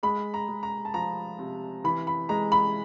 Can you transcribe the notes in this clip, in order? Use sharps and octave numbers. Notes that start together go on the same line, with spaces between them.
G#3 B5
A#5
G#3
A#5
A5
F3 A#5
C3
E3 B5
B5
G#3 A#5
B5